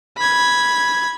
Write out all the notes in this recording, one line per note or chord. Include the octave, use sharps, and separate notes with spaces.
B5 G#6